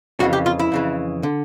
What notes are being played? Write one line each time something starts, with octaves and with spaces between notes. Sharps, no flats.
F2 C#3 E3 F#4
G4
F4
E4
F2 C#3 E3
D3